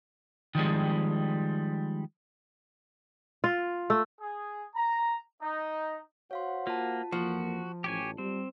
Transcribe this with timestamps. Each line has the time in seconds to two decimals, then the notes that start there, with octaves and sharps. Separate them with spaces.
0.55 D#3 F3 G3 G#3
3.44 F4
3.90 A3
4.19 G#4
4.74 A#5
5.41 D#4
6.31 F#4 C5 C#5 F5 F#5 C6
6.67 A#3 F4 A5
7.12 F2 E3 F3 A#3 F#4
7.84 A1 G4 C#5 G#5
8.18 G3 C4